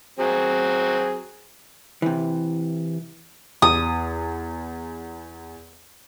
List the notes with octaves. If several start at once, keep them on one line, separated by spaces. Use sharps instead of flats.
F#3 C4 G#4
C3 E3
E2 D#6